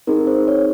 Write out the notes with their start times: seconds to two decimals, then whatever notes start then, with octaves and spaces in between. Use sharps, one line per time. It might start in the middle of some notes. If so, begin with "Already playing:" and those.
0.07 C4 D#4 G#4 A#4
0.27 C5
0.48 C#5